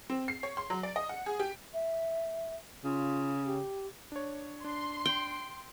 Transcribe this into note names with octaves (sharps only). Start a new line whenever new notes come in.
C4
C7
C#5
C6
F#3
D5
D#5
F#5
G#4
G4
E5
C#3 F4
G4
D4 C#5
D4 C6
G5